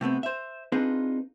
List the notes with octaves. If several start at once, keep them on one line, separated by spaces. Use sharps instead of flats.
C3 A3 B3 C4
C5 E5
C4 D4 D#4 F4 G#4 B4